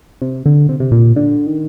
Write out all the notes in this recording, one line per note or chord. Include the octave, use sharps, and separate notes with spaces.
C3
D3
C3
C3
A#2
D3
D#3